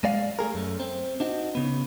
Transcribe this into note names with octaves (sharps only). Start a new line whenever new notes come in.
G#3 D5 F5
A3 G#4 A#4
F#2 A3
C4
D4 D#4 F#4
C#3 B3